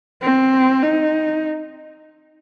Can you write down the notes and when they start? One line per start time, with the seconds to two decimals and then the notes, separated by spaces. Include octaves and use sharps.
0.22 C4
0.83 D#4